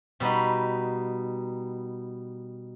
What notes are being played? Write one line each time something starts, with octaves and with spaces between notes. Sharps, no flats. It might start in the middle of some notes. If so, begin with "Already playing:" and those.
B2 G3 B3 D#4